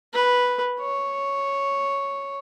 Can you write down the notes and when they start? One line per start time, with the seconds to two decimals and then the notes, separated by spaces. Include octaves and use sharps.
0.14 B4
0.80 C#5